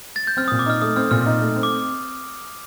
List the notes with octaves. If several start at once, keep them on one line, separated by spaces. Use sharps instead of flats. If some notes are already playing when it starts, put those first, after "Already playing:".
A6
G6
C4 F6
A#2 D#6
D6
D#4 F6
A3 D#6
C4 F6
A#2 F6
D#4
A3
C4
D6